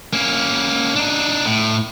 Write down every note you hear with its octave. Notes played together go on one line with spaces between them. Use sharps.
A#3 C#4
D4 D#4
A2